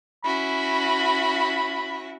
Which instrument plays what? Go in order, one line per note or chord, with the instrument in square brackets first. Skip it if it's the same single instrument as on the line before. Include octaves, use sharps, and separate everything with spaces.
[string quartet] C#4 E4 F#4 [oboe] B5